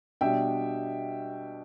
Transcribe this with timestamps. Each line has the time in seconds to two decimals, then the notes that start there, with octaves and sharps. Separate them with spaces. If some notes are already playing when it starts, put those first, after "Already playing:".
0.21 B2 G3 D4 E5 G5